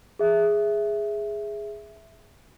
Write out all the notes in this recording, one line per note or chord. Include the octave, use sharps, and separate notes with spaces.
G#4 E5